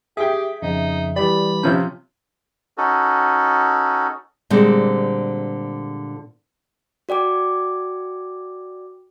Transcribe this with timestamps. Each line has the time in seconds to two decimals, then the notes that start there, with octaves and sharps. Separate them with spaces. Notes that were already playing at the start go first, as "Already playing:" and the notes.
0.17 G4 G#4 E5 G5
0.62 F2 C#3 D#4
1.16 E3 G3 G4 D5 B5
1.63 C3 F3 C#4 G6
2.78 C#4 D#4 F#4 A4
4.50 A#2 D3 G3 G#3 C4
7.09 F#4 D5 G5 D6